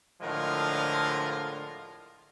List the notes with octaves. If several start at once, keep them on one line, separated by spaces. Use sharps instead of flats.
A2 D3 F3 G#3 F4 A#4